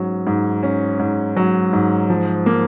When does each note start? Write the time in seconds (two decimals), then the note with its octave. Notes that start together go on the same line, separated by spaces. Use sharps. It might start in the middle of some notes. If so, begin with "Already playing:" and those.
Already playing: G#2 F#3 C#4
0.27 G#2
0.63 C#4
1.00 G#2
1.37 F#3
1.73 G#2
2.09 F3
2.46 A#3